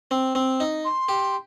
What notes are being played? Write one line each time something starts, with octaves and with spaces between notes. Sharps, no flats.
C4
C4
D#4
C6
G4